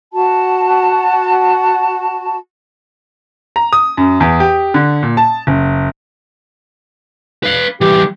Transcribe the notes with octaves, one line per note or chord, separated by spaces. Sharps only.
F#4 A5
A#5
D#6
F#2
E2
G4
D3
A#2
A5
F#1
B4 F5
E3 G3 G4